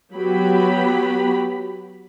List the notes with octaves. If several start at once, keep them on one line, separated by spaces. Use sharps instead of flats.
F#3 B3 G4 B5